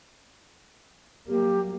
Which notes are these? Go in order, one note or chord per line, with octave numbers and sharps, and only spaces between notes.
F#3 G3 A#3 G4